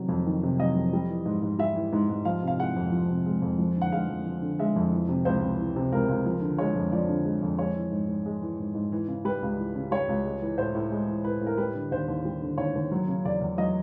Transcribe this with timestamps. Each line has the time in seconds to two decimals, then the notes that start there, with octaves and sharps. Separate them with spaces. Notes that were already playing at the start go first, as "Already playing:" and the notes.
Already playing: C3 D#3 F#3
0.09 F2
0.26 D#3
0.43 C3
0.59 F#3 D#5
0.76 F2
0.93 G3
1.09 E3
1.26 G#2
1.43 G#2
1.59 G3 E5
1.75 E3
1.93 G#2
2.10 G#2
2.25 F3 F5
2.42 C3
2.47 F5
2.59 G#3 F#5
2.76 F2
2.92 F3
3.09 C3
3.26 G#3
3.42 F2
3.59 F3
3.76 D3
3.82 F#5
3.92 G#3 F5
4.09 F2
4.26 F3
4.42 D3
4.59 G#3 E5
4.76 F2
4.92 E3
5.08 C3
5.25 C#2 C5
5.42 C#2
5.59 E3
5.76 C3
5.92 C#2 A#4
6.09 C#2
6.26 F3
6.41 D3
6.58 G#3 C#5
6.76 F2
6.92 F3 D5
7.09 D3
7.25 G#3
7.43 F2
7.59 G#3 C#5
7.76 E3
7.91 G#2
8.08 G#2
8.26 G#3
8.42 E3
8.59 G#2
8.75 G#2
8.92 E3
9.08 C#3
9.25 G3 B4
9.42 C#2
9.58 E3
9.76 C#3
9.91 G3 C#5
10.08 C#2
10.26 G#3
10.42 E3
10.58 A2 C5
10.75 A2
10.92 G#3
11.08 E3
11.24 A2 B4
11.41 A2
11.47 A#4
11.58 G3 B4
11.75 D3
11.91 D#2 C5
12.08 D#2
12.25 G3
12.42 D3
12.58 D#2 C#5
12.75 D#2
12.92 F#3
13.08 C#3
13.25 E2 D5
13.41 E2
13.58 F#3 D#5